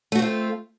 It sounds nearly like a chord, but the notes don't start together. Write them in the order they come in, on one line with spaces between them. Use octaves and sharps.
A3 F#4 C4 F4